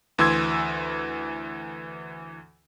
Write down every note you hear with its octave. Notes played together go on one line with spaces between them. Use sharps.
D2 E3 C6 E6 G#6